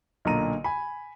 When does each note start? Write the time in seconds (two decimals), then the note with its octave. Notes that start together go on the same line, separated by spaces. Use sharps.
0.25 B1 A#2 D3 A#5 D#7
0.64 G#5 B5